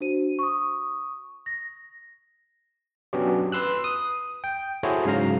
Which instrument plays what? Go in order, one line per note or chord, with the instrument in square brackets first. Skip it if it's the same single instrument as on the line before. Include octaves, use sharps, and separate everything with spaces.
[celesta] D4 F#4 C5 D#7
C#6 D#6
A#6
[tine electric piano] F#3 B3 C#4 D4 F#4 G4
B4 C6 E6 F#6
D#6
G5
E4 F#4 G#4 A4 C5 C#5
G#2 C#3 F#3 F5 A#5 A#6